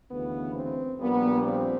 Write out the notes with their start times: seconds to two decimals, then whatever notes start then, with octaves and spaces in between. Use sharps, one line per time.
0.11 D2 C#3 E3 B3
0.55 C4
0.99 A#1 A#2 G3 A#3 B3
1.44 C4